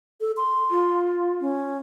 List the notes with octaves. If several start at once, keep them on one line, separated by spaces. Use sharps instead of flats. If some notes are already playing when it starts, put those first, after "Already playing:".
A4
C6
F4
C#4